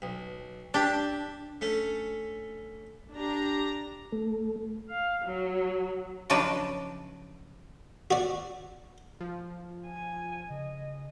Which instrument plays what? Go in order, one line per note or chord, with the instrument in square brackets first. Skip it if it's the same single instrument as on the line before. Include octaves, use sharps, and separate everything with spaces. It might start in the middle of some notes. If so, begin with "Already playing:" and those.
[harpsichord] B1
[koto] D4 [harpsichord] G4 E5 G5
[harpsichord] A3 C#4 A4
[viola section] D4 G4 A#5
[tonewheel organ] A3
[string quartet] F5
F#3
[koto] C#3 F3 F#3 D4 D#4 B4
[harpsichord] F#4 D5
[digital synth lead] F3
[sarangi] G#5
[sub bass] C#3 [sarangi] D#5